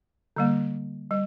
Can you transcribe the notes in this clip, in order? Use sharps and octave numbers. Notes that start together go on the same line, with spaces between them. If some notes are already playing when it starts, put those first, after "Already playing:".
D3 G3 A#3
G3